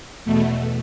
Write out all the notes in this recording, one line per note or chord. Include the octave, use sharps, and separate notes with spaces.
E2 B2 A3